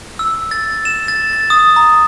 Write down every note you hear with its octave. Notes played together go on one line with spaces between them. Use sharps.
E6
A6
E7
A6
A6
D#6
A#5